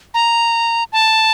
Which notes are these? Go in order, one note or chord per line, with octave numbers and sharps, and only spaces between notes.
A#5
A5